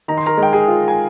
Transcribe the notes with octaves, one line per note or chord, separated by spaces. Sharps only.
D#3 A#5
C6
A#4 A#5
G#3
G5
G#4 G#5
F4
G#5